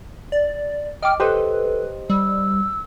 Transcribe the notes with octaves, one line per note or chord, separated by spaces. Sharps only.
D5
D#5 G5 D6 F6
G4 A4 B4 C5 D#5
G3 E6